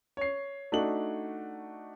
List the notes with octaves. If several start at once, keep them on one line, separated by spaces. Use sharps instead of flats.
C#5 C7
A3 D4 D#4 F#4 F#7